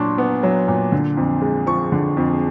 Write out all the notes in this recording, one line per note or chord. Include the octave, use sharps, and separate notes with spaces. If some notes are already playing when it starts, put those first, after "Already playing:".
Already playing: A#2 F#3 D4 C6 C#6
B3
F#3
A#2
D3
F2
G#3
F3 C#6
D3
F2